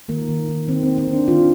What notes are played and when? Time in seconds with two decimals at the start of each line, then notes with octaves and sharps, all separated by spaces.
0.09 D#3 A#3
0.29 D#3
0.48 D#3
0.68 D#3 C4
0.83 A#3 C4
0.98 C4
1.08 D#3
1.13 D4
1.28 D#3 F4